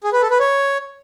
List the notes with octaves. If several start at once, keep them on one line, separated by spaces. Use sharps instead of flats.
G#4
B4
A4
B4
C#5